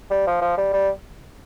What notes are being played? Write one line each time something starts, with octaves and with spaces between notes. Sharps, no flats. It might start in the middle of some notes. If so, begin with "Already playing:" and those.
G3
F3
F3
G3
G3